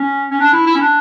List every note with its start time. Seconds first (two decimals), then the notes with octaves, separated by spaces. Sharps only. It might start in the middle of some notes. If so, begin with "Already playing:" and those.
Already playing: C#4
0.31 C#4
0.40 D4
0.53 E4
0.67 E4
0.75 C#4
0.81 D4